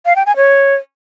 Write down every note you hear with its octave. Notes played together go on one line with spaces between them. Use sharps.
F5
G5
G#5
C#5